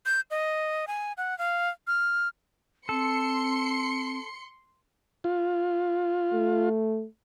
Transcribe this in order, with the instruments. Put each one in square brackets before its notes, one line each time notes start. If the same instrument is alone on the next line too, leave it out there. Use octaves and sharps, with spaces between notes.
[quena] G6
D#5
G#5
F#5
F5
F6
[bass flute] C4 [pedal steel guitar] A4 [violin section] C6 C#7
[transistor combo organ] F4
[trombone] A3